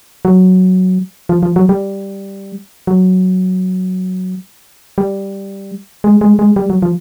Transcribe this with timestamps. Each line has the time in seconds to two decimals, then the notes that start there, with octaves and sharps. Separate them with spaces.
0.25 F#3
1.29 F3
1.43 F3
1.56 F#3
1.69 G3
2.87 F#3
4.98 G3
6.04 G#3
6.21 G#3
6.39 G#3
6.56 G3
6.70 F#3
6.82 F3